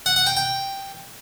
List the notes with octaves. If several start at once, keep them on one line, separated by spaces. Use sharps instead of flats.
F#5
F#5
G5
G5